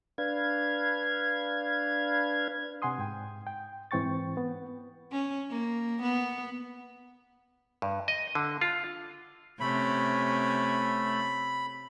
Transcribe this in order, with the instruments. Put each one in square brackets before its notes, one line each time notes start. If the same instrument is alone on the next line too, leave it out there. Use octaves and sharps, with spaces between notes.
[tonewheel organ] D4 B4 F5 G#6
[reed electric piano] C3 F#5 G#5 C6 D#6
G#2 G5
G5
G#2 E3 C4 G5 C#6 A6
B3
[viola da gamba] C#4
A#3
B3
[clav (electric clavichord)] G2
D#5
D3
F4
[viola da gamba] C3 C#4 [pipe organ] A3 [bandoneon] B5